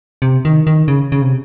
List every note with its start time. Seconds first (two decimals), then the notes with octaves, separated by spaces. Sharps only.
0.22 C3
0.45 D#3
0.67 D#3
0.88 C#3
1.12 C#3
1.22 C3